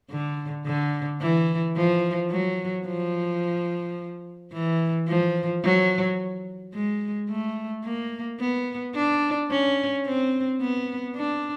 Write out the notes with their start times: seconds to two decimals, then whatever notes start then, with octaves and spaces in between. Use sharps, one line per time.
0.10 D3
0.66 D3
1.21 E3
1.77 F3
2.31 F#3
2.87 F3
4.53 E3
5.08 F3
5.64 F#3
6.74 G#3
7.29 A3
7.84 A#3
8.40 B3
8.95 D4
9.50 C#4
10.06 C4
10.61 B3
11.16 D4